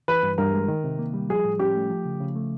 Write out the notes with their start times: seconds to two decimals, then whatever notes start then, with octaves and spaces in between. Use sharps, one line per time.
0.08 E3 B4
0.23 G2
0.38 G2 A#4
0.54 G#3
0.68 D#3
0.84 C3
0.99 A#3
1.14 G3
1.29 F3 G#4
1.45 A2
1.59 C#4 G4
1.75 A3
1.90 F3
2.05 C#3
2.20 C#3
2.36 A3